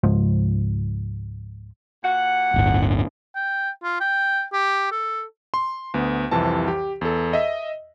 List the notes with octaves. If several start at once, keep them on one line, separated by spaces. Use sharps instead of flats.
C#2 G#2 F3
A#2 F#4 F#5
D1 G1
G5
F4
G5
G4
A4
C6
D2 B3
C2 F2 C3 E3 A5
G4
E2 A4
D#5 E5